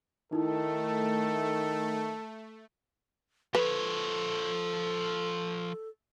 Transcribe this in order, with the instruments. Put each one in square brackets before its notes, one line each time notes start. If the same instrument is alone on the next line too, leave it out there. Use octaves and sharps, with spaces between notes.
[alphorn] D#3 [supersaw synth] A3 [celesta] D#4 E4 [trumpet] A4
[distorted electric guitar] F3 C#5 [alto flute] A4 [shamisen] B4